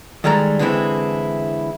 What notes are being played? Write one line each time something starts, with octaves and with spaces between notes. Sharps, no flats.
D#3 G3 G#3 A4 A#5
D3 E3 G#3 C4 E4